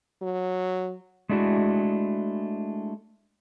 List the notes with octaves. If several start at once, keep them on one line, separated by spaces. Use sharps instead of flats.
F#3
G#3 A3 D4 E4 F#4